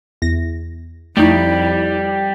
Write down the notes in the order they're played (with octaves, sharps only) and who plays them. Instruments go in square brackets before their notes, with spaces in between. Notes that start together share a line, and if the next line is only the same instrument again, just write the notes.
[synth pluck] E2 A#6
[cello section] F2 [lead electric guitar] G3 G4 [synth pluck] A3 D#4 [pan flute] E4